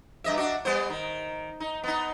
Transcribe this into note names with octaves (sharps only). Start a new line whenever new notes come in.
G2 D#5 E5
D4 F#4
G3 B3 C5
D#3
D#4
B3 D#4